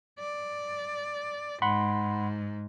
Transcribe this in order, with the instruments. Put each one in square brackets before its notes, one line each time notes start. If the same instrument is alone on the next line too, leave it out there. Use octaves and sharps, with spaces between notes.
[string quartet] D5
[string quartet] G#2 [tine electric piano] F#5 B5 C6